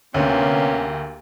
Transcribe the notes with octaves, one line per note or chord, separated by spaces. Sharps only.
D2 C3 A#3 B3 C#4 G4